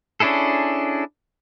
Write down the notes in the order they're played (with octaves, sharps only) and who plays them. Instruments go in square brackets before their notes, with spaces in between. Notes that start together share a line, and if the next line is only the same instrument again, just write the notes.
[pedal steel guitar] C#4 D4 E4 G#4 A4